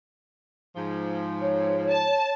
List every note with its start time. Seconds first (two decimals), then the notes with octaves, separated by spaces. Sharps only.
0.76 G#2 F3
1.41 C#5
1.90 A5